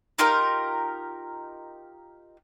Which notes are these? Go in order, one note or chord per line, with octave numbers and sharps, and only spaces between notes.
D#4 F4 G4 A#4